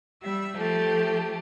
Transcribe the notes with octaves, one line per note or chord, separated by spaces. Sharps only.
G3 E5
F3 A3 G4